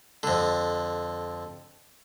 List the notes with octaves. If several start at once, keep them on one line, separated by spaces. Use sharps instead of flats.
F2 D3